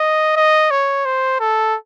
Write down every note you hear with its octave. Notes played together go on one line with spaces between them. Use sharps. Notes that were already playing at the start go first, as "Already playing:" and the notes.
Already playing: D#5
D#5
C#5
C5
A4